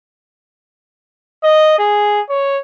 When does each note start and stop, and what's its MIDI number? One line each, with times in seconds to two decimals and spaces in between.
1.44 1.75 75
1.79 2.21 68
2.29 2.60 73